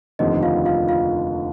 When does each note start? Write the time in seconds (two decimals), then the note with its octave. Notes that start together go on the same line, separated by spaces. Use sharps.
0.19 F1 D#2 D3 F3 C4 D#4 D#5
0.43 F4 F5
0.65 F4 F5
0.89 F4 F5